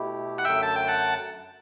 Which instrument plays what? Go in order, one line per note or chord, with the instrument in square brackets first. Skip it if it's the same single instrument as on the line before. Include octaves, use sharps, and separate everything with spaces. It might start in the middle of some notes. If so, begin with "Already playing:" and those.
Already playing: [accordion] B2 A3 E4 G4
[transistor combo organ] F#5
[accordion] F#2 D3 F#3 A3 [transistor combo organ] E5 G5
[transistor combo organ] A5
G5
F#5 A5